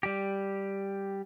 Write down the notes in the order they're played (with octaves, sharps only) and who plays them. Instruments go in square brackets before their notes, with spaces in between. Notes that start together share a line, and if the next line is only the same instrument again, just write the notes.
[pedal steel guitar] G3 G4